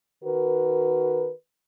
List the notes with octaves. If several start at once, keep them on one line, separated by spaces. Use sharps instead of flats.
D#3 F#4 A#4 B4